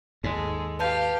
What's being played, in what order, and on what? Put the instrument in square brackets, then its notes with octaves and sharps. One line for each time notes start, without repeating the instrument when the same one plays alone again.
[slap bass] D#2 G#2 [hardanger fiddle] G#3 A4
[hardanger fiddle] G4 F5 [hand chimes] B4 A5 G6